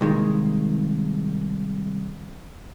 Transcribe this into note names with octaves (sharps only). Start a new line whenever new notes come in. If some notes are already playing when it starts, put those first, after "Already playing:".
C2 D#3 G#3 A#3